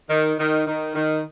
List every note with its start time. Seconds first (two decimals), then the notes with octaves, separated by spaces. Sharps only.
0.10 D#3
0.39 D#3
0.67 D#3
0.95 D#3